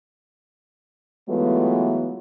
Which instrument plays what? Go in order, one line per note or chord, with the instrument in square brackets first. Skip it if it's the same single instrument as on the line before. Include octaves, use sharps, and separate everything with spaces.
[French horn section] E3 F#3 G#3 A3 B3 F4